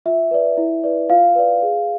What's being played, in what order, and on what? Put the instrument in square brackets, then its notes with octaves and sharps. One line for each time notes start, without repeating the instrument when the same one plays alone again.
[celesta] F4 E5
B4 D5
E4
B4 D5
F4 F5
B4 D5
G#4